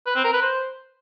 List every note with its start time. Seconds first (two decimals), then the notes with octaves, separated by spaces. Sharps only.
0.06 B4
0.15 C4
0.24 A#4
0.33 B4
0.42 C5